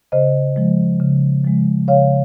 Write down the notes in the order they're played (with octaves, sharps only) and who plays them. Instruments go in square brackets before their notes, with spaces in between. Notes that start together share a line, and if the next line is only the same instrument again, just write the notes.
[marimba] C#3 C5 D#5
F3 G#3
C#3
F3 G#3
C#3 C#5 F5